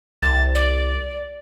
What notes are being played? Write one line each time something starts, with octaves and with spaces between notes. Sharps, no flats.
C2 A6
D5